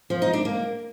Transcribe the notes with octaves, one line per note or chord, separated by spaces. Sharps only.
F3
D#4
D4
A#3